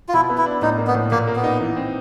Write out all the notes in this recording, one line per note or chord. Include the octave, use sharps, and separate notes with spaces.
F4
B2 E4
B3
E4
D4
A2 D#4
A#3
B3
A2
A#2 A#3
A#3
B3
D#4
E3
C4